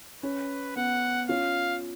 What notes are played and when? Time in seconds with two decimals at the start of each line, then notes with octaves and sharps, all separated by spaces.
0.23 C#4 B4
0.76 B3 F#5
1.29 C#4 F4 F5